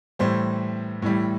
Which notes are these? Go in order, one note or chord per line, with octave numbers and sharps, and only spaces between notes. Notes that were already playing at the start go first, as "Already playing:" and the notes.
A2 E3 G3 C5
A2 E3 G3